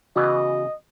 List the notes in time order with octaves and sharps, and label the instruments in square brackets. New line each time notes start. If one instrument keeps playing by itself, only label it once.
[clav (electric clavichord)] C#3 E3 B3 [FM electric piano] F#4 [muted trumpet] D#5